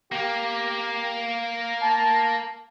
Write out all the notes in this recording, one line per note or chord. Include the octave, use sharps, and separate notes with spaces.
A#3 G4
A5